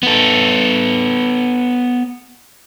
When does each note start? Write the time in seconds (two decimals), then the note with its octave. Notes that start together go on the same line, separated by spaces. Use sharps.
0.03 B3 A4